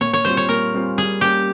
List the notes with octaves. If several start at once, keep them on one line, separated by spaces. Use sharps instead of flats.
A#2 C#5
C#5
G3 C4 F4 C5
C#5
A#2 A#4
G3 C4 F4
G3 G#4
A#3 C#4 G4